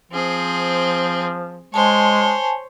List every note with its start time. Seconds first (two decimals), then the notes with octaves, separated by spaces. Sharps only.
0.12 F3 C4 G#4
1.74 G#3 C5 C#5 G#5 A5